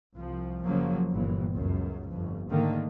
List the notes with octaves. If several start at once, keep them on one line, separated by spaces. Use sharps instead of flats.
C2 F3
F#1 C#3 F3 F#3 A#3
G1 A#2 E3
C#2 F#2
G1 F2
G#2 D3 D#3 A3 A#3